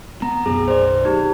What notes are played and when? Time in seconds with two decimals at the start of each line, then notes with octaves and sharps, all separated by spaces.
0.22 B3 A#5
0.46 B1 F#2 G#4
0.68 C5 D5
1.05 D#4 G4